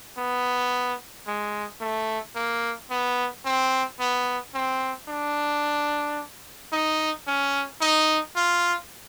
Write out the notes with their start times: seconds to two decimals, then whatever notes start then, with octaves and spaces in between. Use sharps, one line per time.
0.17 B3
1.27 G#3
1.81 A3
2.35 A#3
2.90 B3
3.45 C4
4.00 B3
4.54 C4
5.08 D4
6.72 D#4
7.27 C#4
7.81 D#4
8.36 F4